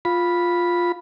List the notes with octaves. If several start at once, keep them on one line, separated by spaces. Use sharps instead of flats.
F4 B5